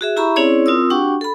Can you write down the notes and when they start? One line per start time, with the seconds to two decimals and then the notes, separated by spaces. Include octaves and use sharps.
0.01 F#4 G#4 E5
0.16 E4 G4 E5 A#5 B5 C#6
0.36 C4 C#4 E4 G#4 C#5 D5
0.66 C4 F4 A#4 D#6 E6
0.90 D4 F#4 G4 F#5 G5 C#6
1.21 A4 B5